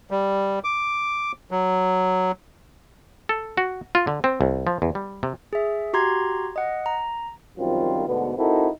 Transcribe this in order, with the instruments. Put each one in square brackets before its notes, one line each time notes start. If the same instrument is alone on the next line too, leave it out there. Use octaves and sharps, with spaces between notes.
[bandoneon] G3
D6
F#3
[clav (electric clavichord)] A4
F#4
F4
D3
C4
C2
F3
E2
G3
C3
[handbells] G#4 E5
F#4 G4 A#5 C6 G#6
D#5 F#5
A#5
[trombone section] F#2 D#3 F3 G3 C4 F4
D2 G#2 B2 D3 B3
C4 D#4 E4 F#4 A4 A#4